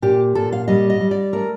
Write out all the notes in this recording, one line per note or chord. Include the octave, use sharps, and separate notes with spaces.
A#2 G4
A#2 A4
F5
G3 D#5
D#5
G3
D5
A3 A#4